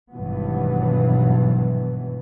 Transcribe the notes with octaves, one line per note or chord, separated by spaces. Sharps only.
G#1 G2 B2 E3 F#3 B3